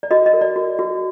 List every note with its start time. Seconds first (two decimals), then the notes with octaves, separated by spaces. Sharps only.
0.03 D5
0.11 F#4 D#5
0.26 D#5
0.33 A#4
0.41 D5
0.56 F#4
0.79 F#4